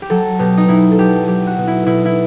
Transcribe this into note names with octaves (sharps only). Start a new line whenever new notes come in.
G4
F#3 A4
B2 G4
D#4
B2 E4
A4
F#3 G4
F#3 G4
F#4
B2
E4
B2 E4
E4